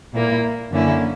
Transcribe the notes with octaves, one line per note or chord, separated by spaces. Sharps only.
A#2 A#3 E4
F#2 D3 A#3 C#4 E4